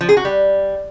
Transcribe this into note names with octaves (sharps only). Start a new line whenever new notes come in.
F3
G#4
F#4
G3